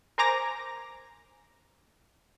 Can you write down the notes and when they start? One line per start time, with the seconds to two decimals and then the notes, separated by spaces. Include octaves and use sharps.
0.18 A#4 C5 G#5 A#5 D6 A#6